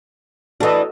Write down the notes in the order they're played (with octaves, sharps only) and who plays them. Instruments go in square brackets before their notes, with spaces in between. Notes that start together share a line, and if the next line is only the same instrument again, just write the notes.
[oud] E3 D4 [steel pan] F#4 A4 D#5